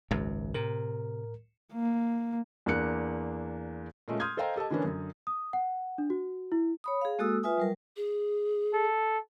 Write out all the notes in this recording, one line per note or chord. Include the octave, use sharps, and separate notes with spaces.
G#1 C#2 F#2
A2 C3 A#4
A#3
E2 A#3 D4 F#6 C#7
A#2 G#3 A3 C#4
C6 D#6 F6 G6 G#6
A4 C5 D#5 F5 G5 A#5
G4 A4 D#5 A5
D3 E3 A#3 B3 C#4 D4
F#2 D3
D#6
F#5
D4
F#4
E4
C#5 B5 D#6
G#4 F5
G#3 A#3 F#4 A4 D#6 E6
F4 B4 E5 G#5 D#6
F#3 G3 A#4
G#4
A4